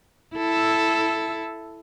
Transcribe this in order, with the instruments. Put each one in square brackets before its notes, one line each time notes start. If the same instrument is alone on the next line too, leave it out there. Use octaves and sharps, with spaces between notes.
[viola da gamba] E4 A4